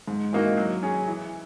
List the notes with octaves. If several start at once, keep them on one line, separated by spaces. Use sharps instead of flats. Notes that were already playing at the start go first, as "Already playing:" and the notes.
G#2
E3 A#3 D#4 F#4
F#3
C#4 G#4
E3